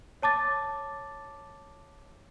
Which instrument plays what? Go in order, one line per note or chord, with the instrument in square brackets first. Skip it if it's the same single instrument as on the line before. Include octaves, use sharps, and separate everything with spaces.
[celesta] C#5 A5 D6 A6